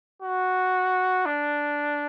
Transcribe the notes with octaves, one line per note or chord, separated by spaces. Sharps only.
F#4
D4